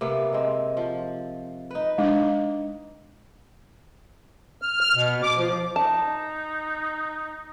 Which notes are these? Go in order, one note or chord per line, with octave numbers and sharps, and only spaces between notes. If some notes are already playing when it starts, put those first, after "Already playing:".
C3 A#3 B3
G#3 C4
F3
D#4 B4
G#3 D4
F6
F6
B2
D6
F3
D#4 A5